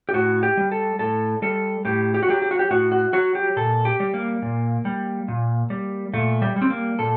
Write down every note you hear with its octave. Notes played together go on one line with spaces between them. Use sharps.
G4
A2 F#4
G4
G3
A4
A2 A4
G3 A4
A2 G4
G4
F#4
F#3 G4
G4
F#4
G4
A2 F#4
F#4
F#3 F#4
G4
A#2 A4
G4
G3
A#3
A#2
G3
A#2
G3
A#2 A3
G3
G3
C4
A#3
A#2 A4